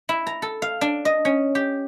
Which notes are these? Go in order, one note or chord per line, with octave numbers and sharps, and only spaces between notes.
E4
A#5
A4
F5
D4
D#5
C#4
G4